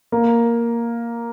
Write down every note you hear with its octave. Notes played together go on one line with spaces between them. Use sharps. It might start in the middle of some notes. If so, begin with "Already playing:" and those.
A#3